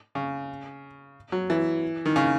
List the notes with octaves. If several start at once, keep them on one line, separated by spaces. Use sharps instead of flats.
C#3
F#3
E3
D#3
C#3